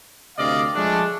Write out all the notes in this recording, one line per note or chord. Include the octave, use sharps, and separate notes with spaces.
D2 C3 D5 D#5 F5
F3 G#3 A3 D4